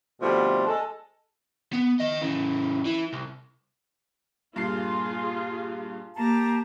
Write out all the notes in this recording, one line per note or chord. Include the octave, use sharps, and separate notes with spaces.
B2 D3 F3 G3 A3 C4
G#3 A4
B3
D#3 D#5
C#3 E3
E3
C2
G2 A#2 F4 G#4 C7
A#3 G4 A5 A#5